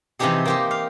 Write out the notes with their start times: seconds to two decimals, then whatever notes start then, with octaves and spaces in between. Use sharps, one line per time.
0.19 C3 E3 F3 D#4 G4 G#4
0.45 A#3 G4 C5
0.71 F5